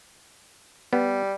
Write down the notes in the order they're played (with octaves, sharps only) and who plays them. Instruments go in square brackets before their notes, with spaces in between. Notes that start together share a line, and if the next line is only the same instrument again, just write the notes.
[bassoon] G3 [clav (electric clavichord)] B3